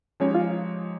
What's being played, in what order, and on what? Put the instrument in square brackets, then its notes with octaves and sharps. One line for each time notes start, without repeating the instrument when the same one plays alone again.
[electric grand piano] F3 G#3 D#4 G4 C#5 [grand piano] C#4
[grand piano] F4